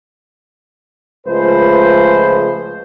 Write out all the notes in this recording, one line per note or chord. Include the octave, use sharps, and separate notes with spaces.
C#2 F3 G#3 A3 B4 C5